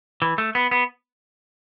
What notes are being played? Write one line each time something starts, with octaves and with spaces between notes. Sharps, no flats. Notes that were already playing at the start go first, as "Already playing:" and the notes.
E3
A3
B3
B3